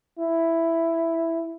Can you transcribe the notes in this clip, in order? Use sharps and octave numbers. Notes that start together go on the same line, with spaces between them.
E4